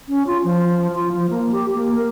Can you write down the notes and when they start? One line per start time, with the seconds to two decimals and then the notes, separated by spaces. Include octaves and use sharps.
0.09 C#4
0.27 F4
0.44 F3
0.95 F4
1.12 F3
1.30 A#3
1.52 G4
1.74 A#3
1.95 A#4